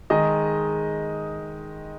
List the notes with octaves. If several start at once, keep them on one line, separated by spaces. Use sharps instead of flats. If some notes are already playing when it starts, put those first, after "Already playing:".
D#3 G#3 D#5